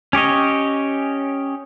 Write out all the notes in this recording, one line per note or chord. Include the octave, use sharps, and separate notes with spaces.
C#4 G4 C#5 D#5